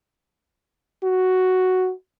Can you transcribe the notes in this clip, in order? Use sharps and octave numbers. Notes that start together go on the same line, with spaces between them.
F#4